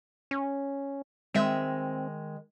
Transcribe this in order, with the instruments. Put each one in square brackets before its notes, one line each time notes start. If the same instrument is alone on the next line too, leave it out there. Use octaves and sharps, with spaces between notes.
[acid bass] C#4
[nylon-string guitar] D#3 G#3 E5 [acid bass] C4